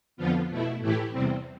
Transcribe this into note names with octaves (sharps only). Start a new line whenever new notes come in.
F2 D3 F3 B3 F4
B2 A3 E4
A2 E3 A3 E4 G4
E2 C3 G3 C4